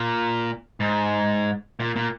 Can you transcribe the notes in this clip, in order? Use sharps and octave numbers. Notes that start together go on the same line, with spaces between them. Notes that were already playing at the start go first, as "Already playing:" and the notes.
Already playing: A#2
G#2
A#2
A#2